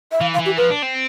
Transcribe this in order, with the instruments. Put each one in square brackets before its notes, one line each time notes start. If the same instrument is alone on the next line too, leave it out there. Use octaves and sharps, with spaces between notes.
[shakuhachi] E5
[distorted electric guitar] E3 [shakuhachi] F5
[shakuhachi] F5
[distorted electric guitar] E3
[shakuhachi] G4
[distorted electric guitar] F3 [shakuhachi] B4
[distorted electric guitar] D4
C4